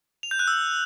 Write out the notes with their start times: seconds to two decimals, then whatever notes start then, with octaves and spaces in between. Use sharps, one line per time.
0.23 F7
0.31 G6
0.39 F#6
0.48 E6